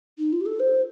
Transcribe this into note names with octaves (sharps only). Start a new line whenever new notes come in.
D#4
F4
G4
A4
C5